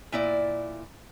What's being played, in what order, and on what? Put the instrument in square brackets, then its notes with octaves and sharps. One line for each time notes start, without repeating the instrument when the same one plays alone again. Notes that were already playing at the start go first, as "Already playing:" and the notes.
[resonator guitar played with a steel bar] A#2 E4 D5